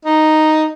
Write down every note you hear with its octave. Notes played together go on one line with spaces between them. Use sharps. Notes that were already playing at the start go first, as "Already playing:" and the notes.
D#4